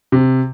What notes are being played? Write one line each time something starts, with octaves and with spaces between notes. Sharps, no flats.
C3